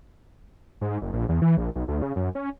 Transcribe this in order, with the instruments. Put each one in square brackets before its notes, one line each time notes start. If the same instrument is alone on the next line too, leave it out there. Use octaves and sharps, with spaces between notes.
[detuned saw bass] G#2
F#1
A#1
E2
E3
A#1
B1
D2
C#3
F#2
C#4